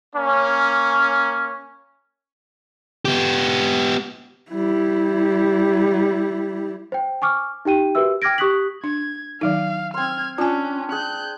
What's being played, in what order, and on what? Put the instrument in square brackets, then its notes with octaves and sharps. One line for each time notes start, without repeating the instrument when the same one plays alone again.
[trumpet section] A#3 C#4
[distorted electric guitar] B3 G4
[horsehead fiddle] G3 E4
[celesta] C5 G5
G#5 C#6 D6 F6
D#4 G4 G5 D#7
F#4 G4 A#4 B4 E5 E6
G5 D6 F6 G#6 A#6 D7
G4 C#6 D#6 F#6 B6 F#7
[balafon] D4 [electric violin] G#6
[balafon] D#3 F#3 D#4 [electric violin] F5
[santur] C4 C6 [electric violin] F6 G#6
[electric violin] C#4 [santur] D4 [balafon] F4 G#5
[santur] G#4 [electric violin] F#6 G6